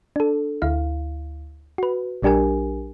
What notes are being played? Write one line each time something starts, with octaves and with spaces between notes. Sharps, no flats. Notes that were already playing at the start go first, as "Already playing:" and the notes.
D4 A4
D2 E4 F5
F#4 B4
A#1 G3 D4 G4 A#4 G#5